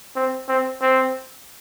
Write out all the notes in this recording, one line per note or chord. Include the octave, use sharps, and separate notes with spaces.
C4
C4
C4